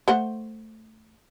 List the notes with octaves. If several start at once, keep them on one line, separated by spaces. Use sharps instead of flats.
A3 C5 F#5